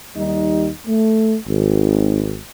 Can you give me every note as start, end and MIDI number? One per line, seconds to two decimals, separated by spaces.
0.15 0.70 39
0.15 0.70 55
0.15 0.70 63
0.87 1.35 57
1.48 2.37 32